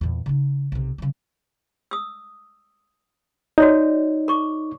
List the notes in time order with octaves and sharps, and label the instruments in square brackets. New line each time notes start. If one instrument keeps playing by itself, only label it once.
[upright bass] E2 A#2
C#3 D#4
B1 C3
C#3 G3
[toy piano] D#6 E6
[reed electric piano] D#4 [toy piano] F#4 C#5 D5
[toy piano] A#4 C#6 D6